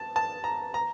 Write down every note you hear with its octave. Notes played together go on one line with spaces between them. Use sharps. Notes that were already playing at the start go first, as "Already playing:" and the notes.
Already playing: A5
A5
A#5
A#5